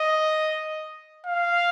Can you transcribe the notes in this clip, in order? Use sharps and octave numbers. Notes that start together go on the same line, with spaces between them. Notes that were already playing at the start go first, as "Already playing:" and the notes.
Already playing: D#5
F5